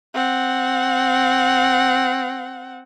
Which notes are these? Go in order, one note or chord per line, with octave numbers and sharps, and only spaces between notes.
C4 F#5